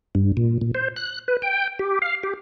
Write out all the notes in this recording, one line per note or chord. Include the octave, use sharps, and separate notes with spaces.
G2
A#2
A#2
C5
F#6
B4
G5
G4
F5
G4